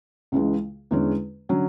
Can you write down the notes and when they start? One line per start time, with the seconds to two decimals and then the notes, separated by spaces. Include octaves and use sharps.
0.32 C#2 C#3 E3 G#3
0.91 E2 D3 G#3 C#4
1.49 D3 F#3 C#4